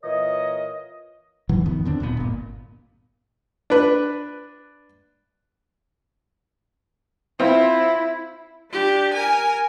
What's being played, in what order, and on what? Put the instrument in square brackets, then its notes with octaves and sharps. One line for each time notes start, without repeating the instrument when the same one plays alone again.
[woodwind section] A#2 E3 A#4 C#5 D#5
[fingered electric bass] G#2 E3 F#3
E2 D#3 F3 B3
D3 C4 D4
D1 A#2 B3
G1 A#2
[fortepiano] D4 B4
[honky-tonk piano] C4 F4 [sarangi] E4
[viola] D4 G4
A#4 G#5